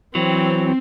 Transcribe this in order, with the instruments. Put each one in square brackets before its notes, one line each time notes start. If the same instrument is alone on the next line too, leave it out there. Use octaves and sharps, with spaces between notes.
[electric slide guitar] E3 F#3 [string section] C4